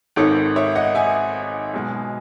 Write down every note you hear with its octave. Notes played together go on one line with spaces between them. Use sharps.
G#1 G#2 D#3 A4 C#5
C#5 E5
D#5 F#5
E5 G#5
B1 B2 G#3